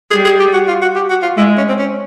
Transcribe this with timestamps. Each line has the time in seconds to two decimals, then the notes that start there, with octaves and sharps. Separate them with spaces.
0.11 G3 G#4
0.25 G#4
0.39 G4
0.53 F#4
0.68 F4
0.82 F#4
0.95 G4
1.10 F#4
1.22 F4
1.37 G#3 E4
1.58 C#4
1.68 C4
1.78 C#4